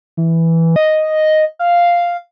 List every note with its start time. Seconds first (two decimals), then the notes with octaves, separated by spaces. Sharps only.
0.17 E3
0.76 D#5
1.59 F5